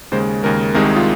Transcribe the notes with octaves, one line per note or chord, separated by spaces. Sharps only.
D#2 C#3 G#3 C5
D#2 C#3 G#3 A#4
C2 C3 D#3 G#3 A#4
G#4
F4